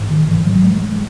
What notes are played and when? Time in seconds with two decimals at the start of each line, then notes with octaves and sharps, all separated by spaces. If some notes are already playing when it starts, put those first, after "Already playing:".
Already playing: A1 G#2
0.10 D#3
0.28 E3
0.46 F#3
0.65 G#3
0.82 G#3